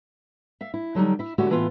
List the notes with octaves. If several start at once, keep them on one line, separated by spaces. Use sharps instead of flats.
E5 F5
E4
D3 F#3 G3 D#4
E4 E5
D3 A3 E4 F#4 G4 C#5
A2 E3 B3 F4